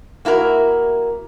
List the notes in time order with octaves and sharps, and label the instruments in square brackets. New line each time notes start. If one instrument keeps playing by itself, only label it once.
[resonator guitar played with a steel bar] A#3 E4 F#4 A#4